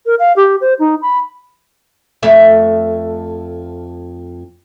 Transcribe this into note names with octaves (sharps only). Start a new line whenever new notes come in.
A#4
F5
G4
C5
D#4
B5
F2 A3 E5